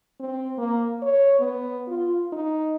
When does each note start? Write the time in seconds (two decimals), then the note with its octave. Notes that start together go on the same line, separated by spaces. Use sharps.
0.20 C4
0.58 A#3
1.02 C#5
1.39 B3
1.88 F4
2.33 D#4